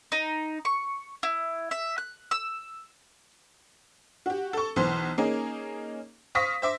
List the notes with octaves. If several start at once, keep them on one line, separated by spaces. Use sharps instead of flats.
D#4
C#6
E4
E5
F#6
E6
F#4 G4
A4 C#6
B1 E3 C5 C6
A#3 C#4 D#4 G#4
C5 F5 C#6 D#6 A#6 B6
C5 E5 D6